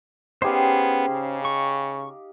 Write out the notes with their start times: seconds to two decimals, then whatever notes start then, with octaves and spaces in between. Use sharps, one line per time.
0.42 B3 C#4 D#4 G4 G#4 C5 F5
1.09 C#3
1.45 C#6